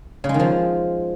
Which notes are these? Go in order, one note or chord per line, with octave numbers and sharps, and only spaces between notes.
C#3
G#3
D#3
F3